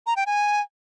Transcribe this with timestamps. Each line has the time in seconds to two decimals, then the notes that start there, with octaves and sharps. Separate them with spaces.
0.07 A#5
0.16 G5
0.26 G#5